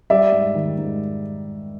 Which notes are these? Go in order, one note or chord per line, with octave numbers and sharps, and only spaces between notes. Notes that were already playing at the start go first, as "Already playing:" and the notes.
G3 D5 E5
G#2
D#3
G#2